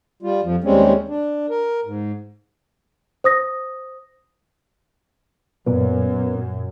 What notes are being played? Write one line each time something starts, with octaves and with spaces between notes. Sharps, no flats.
G3 F4
F2 F3
D#2 G3 G#3 C4 C#4
D4
A#4
G#2
C5 D#6 A#6
F#2 A#2 F#3 B3